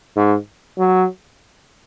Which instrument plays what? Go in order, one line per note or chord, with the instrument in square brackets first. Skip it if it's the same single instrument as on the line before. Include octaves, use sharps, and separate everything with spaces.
[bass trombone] G#2
F#3